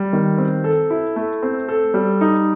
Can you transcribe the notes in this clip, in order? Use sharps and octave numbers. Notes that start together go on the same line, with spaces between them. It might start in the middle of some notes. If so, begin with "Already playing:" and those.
Already playing: G3
D#3
C4
A4
E4
A3
C4
A4
G3
D#4